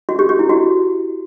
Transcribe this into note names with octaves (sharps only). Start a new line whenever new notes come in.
F#4
G4
G4
E4
F#4